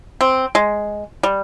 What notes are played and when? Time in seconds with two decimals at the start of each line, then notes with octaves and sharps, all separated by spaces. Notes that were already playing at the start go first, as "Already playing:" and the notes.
0.21 C4
0.55 G#3
1.23 G3